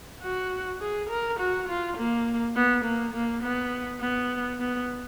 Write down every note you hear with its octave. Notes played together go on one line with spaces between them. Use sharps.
F#4
G#4
A#4
F#4
F4
A#3
B3
A#3
A#3
B3
B3
B3